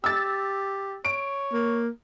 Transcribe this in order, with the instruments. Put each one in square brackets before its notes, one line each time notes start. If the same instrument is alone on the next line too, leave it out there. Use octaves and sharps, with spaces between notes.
[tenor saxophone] G4 [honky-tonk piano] E6 A6
[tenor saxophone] C#5 [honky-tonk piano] D7
[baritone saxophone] A#3